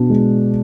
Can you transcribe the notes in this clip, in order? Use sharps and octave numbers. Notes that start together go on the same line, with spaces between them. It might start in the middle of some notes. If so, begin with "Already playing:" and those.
Already playing: B2 D4
G#3